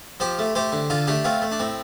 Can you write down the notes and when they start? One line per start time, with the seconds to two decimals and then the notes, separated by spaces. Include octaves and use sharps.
0.20 F3 G4 C5
0.39 A3
0.55 A3 G4 C5
0.72 D3
0.90 D3 F4 A4
1.07 A3 D4 G4
1.24 A3 C4 F4
1.42 A3
1.52 D4
1.60 A2 C4